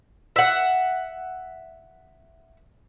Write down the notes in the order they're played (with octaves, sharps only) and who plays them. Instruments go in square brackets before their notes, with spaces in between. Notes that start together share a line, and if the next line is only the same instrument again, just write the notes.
[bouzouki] E5 F#5